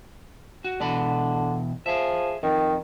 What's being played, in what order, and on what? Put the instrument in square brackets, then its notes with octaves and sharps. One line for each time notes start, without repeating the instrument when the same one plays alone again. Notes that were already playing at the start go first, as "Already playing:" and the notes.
[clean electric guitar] F#4
[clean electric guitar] B2 E3 B5 [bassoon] D3
[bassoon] F3 [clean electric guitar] G#4 E5
[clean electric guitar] F2 [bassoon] D#3